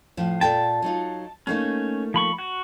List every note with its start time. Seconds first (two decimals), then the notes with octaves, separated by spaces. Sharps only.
0.17 A2 F3
0.41 A#2 A4 G5 A5
0.82 F#3 D#4 F4
1.47 A3 A#3 C#4 D#4
2.14 F3 B5 C#6
2.38 F#4